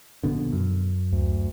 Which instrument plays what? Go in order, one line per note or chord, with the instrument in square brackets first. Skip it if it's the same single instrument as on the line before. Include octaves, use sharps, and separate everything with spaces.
[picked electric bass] A#1 B2 D3
F#2
[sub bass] D2